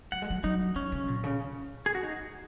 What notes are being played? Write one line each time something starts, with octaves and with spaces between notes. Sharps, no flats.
F#3 F#5
G#3
F#3
F#3 D#4
F#3 C#4
C#3
A#2
C#3
G#4
F#4
D#4